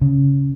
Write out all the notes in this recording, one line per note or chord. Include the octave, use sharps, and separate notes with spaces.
C#3